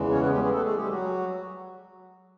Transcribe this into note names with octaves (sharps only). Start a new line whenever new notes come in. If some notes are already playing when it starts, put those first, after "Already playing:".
Already playing: E2 C#3 E3 G#3
C#4 C#5
B3 B4
G3 G4
G#3 G#4
A3 A4
G#3 G#4
G3 G4
F#3 F#4